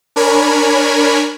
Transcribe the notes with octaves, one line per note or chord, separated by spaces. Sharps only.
D4 A#4 C#5 G#5 B5